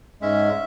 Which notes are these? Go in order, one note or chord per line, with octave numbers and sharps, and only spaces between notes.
G#2 G#3 C#4 E5